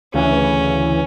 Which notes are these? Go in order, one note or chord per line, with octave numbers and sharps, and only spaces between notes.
D2 C#3 E3 C#4